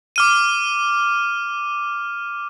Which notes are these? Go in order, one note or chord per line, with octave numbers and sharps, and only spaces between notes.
D6 F6 D#7